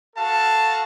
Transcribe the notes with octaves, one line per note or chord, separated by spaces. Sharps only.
F#4 A4 F5 A5